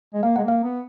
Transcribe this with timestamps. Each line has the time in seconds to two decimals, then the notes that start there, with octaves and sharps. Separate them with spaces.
0.14 G#3
0.23 A#3 F5
0.36 G#3 F#5
0.44 A#3 F5
0.63 B3